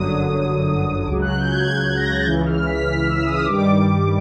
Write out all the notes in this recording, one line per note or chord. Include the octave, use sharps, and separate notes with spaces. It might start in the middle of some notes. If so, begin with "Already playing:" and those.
Already playing: G1 F#2 D3 F#3 D#6
C#2 C#3 F#3 D6
F#6
G6
G#6
G#6
G#6
A#6
A6
C#2 C#3 E3 G6
F6
B6
F6
E6
D#6
G2 D#3 G3 D6